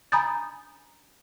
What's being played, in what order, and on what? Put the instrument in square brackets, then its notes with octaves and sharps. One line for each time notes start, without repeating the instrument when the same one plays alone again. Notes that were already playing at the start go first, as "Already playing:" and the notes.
[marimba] G#5 A#5 B5 D#6 G6 A6